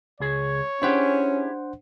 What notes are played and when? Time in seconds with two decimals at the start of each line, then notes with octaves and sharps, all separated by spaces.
0.20 C#2 G#4 C#5
0.82 C#4 D4 E4 G4 G#4 C5 F#5